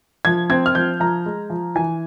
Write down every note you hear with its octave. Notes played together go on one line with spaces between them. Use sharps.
F3 G#6
C4 G#6
F6
F3 G6
F3 A#5
G#3
F3
E3 G#5